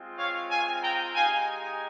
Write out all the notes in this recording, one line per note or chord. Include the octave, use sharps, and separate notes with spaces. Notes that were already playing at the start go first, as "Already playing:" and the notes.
Already playing: G#3 C4 F4
C#5 F5
F5 G#5
G5 A#5
G#3 D#4 G4 F5 G#5